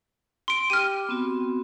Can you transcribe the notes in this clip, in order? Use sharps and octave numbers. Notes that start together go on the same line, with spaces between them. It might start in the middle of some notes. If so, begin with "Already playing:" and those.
C6 D7
G4 G5 D6 F6 D#7
B3 C4 F#4